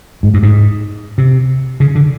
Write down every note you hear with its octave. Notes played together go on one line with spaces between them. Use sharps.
G#2
G2
G#2
C3
C#3
D3